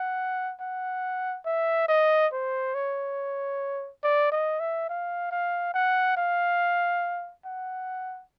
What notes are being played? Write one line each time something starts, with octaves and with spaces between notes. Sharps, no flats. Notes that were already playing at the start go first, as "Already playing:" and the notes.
Already playing: F#5
F#5
E5
D#5
C5
C#5
D5
D#5
E5
F5
F5
F#5
F5
F#5